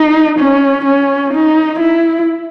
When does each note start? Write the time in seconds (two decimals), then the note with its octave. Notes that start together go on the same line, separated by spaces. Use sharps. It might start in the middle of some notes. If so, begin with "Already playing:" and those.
Already playing: D#4
0.39 C#4
0.85 C#4
1.33 D#4
1.80 E4